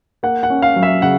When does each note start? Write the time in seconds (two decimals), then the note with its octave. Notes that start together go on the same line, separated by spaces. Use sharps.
0.23 A#3 F#5
0.43 F#5
0.50 C#4
0.62 F5
0.76 F#3
0.83 E5
1.02 C#3 F#5